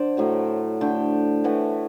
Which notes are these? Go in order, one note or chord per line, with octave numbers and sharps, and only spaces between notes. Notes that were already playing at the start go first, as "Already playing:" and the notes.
Already playing: D3 C5 D5
A2 F#3 A3
D3 A3 G5
A2 E3 A3 F#5